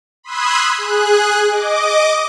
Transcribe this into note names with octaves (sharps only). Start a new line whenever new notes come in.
B5 C6 D#6 E6 F#6 G#6
G#4 F#6
D#5 D6